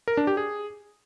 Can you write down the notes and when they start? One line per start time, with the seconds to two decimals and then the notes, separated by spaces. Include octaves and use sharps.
0.08 A#4
0.17 D4
0.27 G4
0.37 G#4